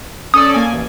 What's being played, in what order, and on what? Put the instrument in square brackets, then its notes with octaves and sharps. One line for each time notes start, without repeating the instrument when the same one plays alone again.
[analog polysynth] C#4 A4 D5 [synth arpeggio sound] D#6
[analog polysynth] A#3 G#5
A1